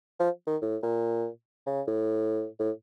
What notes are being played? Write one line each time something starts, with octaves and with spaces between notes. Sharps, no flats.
F3
D#3
A2
A#2
C#3
A2
A2